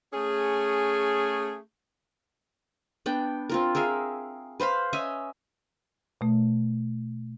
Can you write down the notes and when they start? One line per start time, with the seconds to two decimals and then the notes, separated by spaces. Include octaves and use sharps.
0.13 A3 C#4 G#4
3.06 B3 D4 G5
3.49 C4 F4 A#4
3.75 G#4 A#4 E5 F5
4.60 B4 C5 F5 B5
4.93 C#4 D#5 E5 G#5
6.21 B2 A3